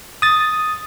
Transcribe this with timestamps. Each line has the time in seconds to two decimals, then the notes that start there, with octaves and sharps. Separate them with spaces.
0.22 D#6 A6